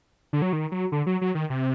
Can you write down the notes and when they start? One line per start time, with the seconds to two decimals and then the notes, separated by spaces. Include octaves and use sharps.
0.33 D3
0.42 F#3
0.53 D#3
0.72 F#3
0.92 D3
1.06 F#3
1.21 F#3
1.35 D#3
1.50 C3